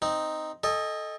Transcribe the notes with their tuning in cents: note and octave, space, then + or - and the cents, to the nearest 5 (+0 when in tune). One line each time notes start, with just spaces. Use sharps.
C4 -5 D#4 +0
A4 +0 D#5 +0 G#5 -40